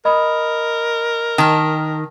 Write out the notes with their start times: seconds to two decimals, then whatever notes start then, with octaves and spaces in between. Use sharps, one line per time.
0.05 A#4 D#5 B5 D#6
1.38 D#3 G5 A5 F6